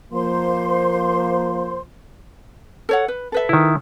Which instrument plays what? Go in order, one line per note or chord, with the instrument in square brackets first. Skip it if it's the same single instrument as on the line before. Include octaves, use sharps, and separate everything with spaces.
[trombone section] F3 A#3 [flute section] C5 C6
[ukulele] A4 C#5 F#5
B4
A4 B4 E5
[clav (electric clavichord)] D#3 E4